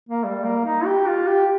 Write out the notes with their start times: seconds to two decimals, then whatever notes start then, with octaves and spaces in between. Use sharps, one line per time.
0.09 A#3
0.24 G3
0.44 A#3
0.66 D#4
0.85 G4
1.07 F4
1.27 G4